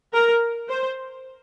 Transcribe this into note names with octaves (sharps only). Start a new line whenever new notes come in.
A#4
C5